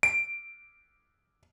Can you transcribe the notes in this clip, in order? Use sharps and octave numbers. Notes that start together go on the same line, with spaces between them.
D7